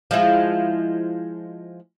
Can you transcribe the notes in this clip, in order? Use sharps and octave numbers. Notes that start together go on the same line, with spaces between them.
F3 G#3 E4